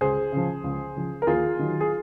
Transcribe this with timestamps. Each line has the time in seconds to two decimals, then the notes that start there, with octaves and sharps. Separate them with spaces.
0.01 C#2 G#4 C5
0.32 C#3 F3
0.64 C#2
0.96 C#3 F3
1.22 A#4
1.27 D#2 F4 G#4
1.59 D#3 F#3
1.80 G#4